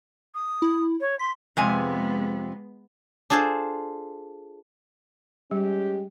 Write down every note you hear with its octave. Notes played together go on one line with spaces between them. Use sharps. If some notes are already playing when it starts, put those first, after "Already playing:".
D#6
E4
C#5
C6 B6
F2 C3 G#3 B3 G#5
D4 F4 G#4 A4 C5
G3 G#3 C#4 G4